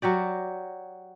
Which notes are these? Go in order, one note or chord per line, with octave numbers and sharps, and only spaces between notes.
F#3 F#4 G4 D5